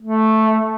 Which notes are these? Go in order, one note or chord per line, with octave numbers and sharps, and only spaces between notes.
A3